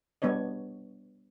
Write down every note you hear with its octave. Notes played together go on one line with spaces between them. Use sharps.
G3 B3 D4 C#5 D#5